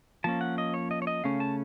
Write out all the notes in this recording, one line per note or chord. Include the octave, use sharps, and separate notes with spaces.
F3 A#3 C#4 A5
F#5
D#5
C#5
D#5
C#5
D#5
C#3 A3 C#4 F5
A5